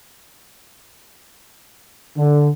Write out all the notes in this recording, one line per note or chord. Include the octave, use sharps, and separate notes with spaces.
D3